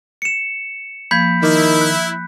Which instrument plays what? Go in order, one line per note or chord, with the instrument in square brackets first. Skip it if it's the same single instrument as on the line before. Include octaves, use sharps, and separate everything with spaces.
[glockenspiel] C#7 E7
[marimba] F3 A#3 [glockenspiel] B5 G6 B6
[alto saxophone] D#3 [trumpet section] E4 [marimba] E5 D6
[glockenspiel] F#6